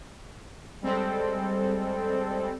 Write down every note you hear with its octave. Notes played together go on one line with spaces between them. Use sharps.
G3 G#3 C4 A4